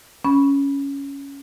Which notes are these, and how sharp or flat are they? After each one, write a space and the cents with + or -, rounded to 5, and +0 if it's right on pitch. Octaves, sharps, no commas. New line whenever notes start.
C#4 +5 B5 -15